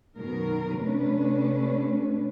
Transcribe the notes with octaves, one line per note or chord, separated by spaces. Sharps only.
F#2 B2 D#3 A#4
C3 A3 C#4 D4 B4